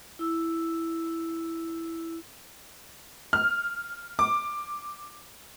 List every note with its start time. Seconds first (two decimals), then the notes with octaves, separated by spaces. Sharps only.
0.19 E4 E6
3.33 F6
4.19 D6